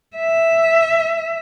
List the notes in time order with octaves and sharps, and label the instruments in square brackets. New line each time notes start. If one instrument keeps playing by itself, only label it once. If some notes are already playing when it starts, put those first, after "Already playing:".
[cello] E5